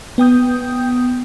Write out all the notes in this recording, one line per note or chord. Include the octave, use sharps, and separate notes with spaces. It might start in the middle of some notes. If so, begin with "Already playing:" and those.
B3 G5 D#6 G6